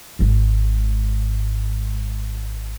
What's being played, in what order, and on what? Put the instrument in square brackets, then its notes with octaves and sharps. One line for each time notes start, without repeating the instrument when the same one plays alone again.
[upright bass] G#1 G#2